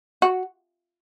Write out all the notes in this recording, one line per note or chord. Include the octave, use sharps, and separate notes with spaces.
F#4